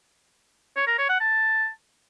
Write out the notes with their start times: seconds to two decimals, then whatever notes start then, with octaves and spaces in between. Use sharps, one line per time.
0.77 C#5
0.87 A#4
0.98 C#5
1.09 F#5
1.20 A5